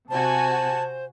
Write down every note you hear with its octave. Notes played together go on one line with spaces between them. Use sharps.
C3 F#4 C5 G#5 A5